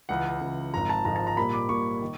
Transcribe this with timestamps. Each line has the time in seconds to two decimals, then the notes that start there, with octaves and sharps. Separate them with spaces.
0.09 C#2 C#3 E3 F#5
0.41 C#2 C#3 E3
0.74 G#1 G#2 F3 A#5
0.89 A5
1.05 G#1 G#2 F3 A#5
1.16 A5
1.27 A#5
1.37 A#2 G3 A#3 B5
1.53 D6
1.69 A#2 G3 A#3 C#6
2.02 D#3